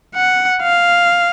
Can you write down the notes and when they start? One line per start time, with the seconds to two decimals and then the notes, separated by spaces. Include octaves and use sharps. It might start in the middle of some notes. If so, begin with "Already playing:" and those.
0.16 F#5
0.63 F5